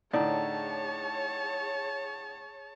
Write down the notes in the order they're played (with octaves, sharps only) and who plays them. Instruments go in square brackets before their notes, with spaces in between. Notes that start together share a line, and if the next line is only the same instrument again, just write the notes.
[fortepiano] A2 D3 [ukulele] D#4 D5 [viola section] G#4 C#5 [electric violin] A5